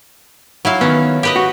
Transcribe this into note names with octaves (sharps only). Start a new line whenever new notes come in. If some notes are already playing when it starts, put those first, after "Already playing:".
F#3 E4 F5
D#3 B3 C#4
G4 B4 D#5
F#4